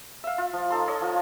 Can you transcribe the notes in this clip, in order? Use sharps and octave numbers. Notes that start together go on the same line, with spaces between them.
E5 F5
F4
F3
D#4 A4 C6
A4 C#5 D#5
F3 F4